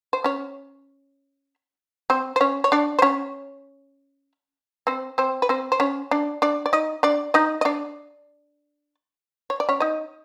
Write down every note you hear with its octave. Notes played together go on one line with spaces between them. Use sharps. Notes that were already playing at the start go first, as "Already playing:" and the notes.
C5
C#4 C#5
C4 C5
C5
C#4 C#5
C#5
D4 D5
C5
C#4 C#5
C4 C5
C4 C5
B4
C4 C5
C5
C#4 C#5
D4 D5
D4 D5
D5
D#4 D#5
D4 D5
D#4 D#5
D#5
D4 D5
C#5
D5
C#4 C#5
D#4 D#5